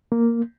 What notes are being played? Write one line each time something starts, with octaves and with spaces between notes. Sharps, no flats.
A#3